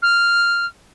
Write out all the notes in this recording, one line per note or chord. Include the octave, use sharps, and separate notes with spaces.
F6